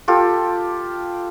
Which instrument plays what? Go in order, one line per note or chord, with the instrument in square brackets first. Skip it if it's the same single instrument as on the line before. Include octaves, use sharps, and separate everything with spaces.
[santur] F4 G4 A4